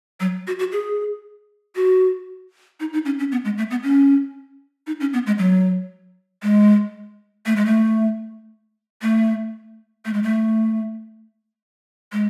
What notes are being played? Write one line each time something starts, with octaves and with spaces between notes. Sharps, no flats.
F#3
F#4
F#4
G#4
F#4
D#4
D#4
C#4
C#4
B3
G#3
A3
B3
C#4
D#4
C#4
B3
G#3
F#3
G#3
A3
G#3
A3
A3
A3
G#3
A3
G#3